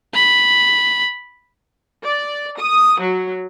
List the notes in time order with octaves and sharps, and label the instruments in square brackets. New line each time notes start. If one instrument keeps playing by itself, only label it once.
[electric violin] B5
[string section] D5
D#6
F#3